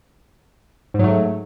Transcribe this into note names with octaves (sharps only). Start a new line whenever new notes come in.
G#2 F#3 A3